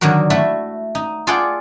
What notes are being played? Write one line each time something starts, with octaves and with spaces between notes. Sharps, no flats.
D3 D#3 F#3 F#4 A#4
A3 E4 F#4 A4
D#4
F4 G#4 A4 D5 F#5 G5